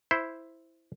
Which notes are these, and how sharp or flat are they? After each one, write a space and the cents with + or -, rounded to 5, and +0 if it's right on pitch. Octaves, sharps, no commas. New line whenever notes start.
E4 +0 C5 +0